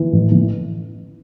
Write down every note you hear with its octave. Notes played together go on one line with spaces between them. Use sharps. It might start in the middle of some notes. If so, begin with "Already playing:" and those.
Already playing: E3
A1
E3